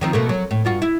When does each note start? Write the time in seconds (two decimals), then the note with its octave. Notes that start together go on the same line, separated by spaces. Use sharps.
0.01 D#3 F3 C4
0.13 B2 A3 A#3
0.29 F#3
0.51 A2
0.65 G2 F4 F#4
0.82 E4